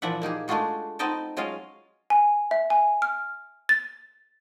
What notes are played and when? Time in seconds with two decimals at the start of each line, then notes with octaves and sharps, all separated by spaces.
0.02 A#2 E3 F3 D5 E5 F#5
0.22 A#3 D#4 G4 G#4
0.48 G#3 A3 D4 F4 F#4 G#4
0.99 B3 C4 D#4 D#5 G5 A5
1.37 F#3 G#3 C#4 F4 D#5 F5
2.10 G#5
2.51 E5
2.70 G#5
3.02 F6
3.69 A6